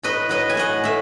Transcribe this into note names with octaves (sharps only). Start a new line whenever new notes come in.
A2 B4 D#5
F#3 B4 D#5
G#5
A2 D#5 F#5
A2 E5